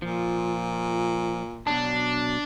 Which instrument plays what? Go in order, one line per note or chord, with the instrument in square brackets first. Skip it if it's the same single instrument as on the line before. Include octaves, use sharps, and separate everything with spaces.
[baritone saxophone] A#2 [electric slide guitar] F3
[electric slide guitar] B2 F#3 A5 [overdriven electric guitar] D4